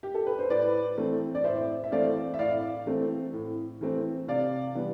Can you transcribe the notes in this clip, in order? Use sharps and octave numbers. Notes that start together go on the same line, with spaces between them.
G4
A4
B4
C5
A2 B4 D5
E3 A3 C4
D5
A2 C5 E5
E5
E3 A3 C4 D5 F5
E5
A2 D5 F5
E3 A3 C4
A2
E3 A3 C4
C3 D5 F5
E3 G3 B3